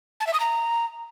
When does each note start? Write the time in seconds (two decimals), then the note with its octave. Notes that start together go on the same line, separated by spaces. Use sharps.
0.20 A5
0.27 E5
0.33 D#6
0.40 A#5